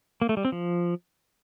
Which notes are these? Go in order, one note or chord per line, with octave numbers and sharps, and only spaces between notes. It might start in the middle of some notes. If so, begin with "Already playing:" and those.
A#3
A3
G3
C4
F3